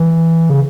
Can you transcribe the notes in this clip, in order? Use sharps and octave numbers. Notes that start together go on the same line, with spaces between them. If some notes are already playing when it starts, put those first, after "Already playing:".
Already playing: E3
C#3